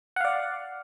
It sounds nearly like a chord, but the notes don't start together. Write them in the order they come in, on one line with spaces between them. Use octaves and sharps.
F#5 F5 D5